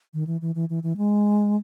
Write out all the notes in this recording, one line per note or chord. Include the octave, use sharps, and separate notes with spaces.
D#3
E3
E3
E3
E3
E3
G#3